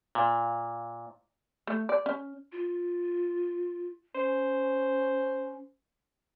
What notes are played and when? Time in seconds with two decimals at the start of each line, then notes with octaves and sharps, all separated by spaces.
0.15 A#2
1.67 A3
1.89 D5
2.06 C#4
2.52 F4
4.15 C#4 C5